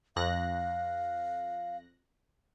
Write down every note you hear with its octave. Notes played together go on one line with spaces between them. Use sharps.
F2 F5 F#6 A#6